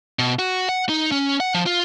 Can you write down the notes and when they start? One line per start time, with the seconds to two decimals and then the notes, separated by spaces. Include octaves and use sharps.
0.19 B2
0.39 F#4
0.69 F#5
0.89 D#4
1.12 C#4
1.40 F#5
1.54 F3
1.66 F4